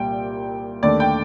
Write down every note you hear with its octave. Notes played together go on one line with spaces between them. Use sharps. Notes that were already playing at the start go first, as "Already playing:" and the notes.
Already playing: C2 A#2 G3 G5
D#2 D3 A3 D5
G5